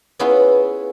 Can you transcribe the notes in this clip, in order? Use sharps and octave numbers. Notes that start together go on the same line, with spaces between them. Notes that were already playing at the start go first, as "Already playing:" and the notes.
B3 C#4 E4 F4 G#4 B4